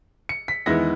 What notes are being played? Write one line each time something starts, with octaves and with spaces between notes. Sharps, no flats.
C#7
B6
E2 D#3 G#3 B3 E4 A#6